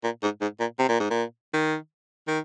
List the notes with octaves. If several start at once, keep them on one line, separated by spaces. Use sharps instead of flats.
A#2
G#2
G#2
A#2
C3
A#2
G#2
A#2
D#3
D#3